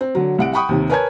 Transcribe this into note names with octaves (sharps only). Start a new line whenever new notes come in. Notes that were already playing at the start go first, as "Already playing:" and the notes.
C4
D3 F#3
C2 F#5 D7
F#5 G5 B5 C#6 D#6
D#2 C3 D#3
A#4 B4 C#5 G#5 A5 G#6